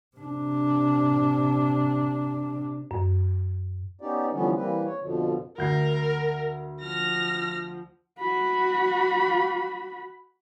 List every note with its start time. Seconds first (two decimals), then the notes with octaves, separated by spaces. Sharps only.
0.17 C3 D4
2.91 F#2
4.01 B3 C#4 D#4 G4 D5
4.32 D3 E3 F3 G3 B3 C#4
4.56 E3 G3 A#3 C4 B4
4.85 C#5
5.01 F2 B2 D3 F3
5.58 D2 A#4 G6 C7
6.83 F3 F6 A#6
8.19 F#4 B5